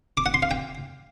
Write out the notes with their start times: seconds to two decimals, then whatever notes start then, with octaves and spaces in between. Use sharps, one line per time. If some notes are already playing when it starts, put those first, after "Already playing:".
0.17 D6
0.26 F#5
0.34 C6
0.42 F5
0.51 G5